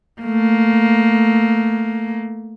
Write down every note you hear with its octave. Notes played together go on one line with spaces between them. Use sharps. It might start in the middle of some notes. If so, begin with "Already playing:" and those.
A3 A#3